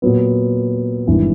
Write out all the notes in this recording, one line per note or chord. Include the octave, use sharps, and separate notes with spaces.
A#2 F#3 B3
G#1 G2 E3